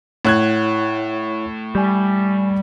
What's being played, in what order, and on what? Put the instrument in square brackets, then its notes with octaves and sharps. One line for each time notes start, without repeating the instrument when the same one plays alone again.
[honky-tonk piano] A2 F#6 G#6 [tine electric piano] E4 C#5 F#5
[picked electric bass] G3 [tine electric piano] G#5 G6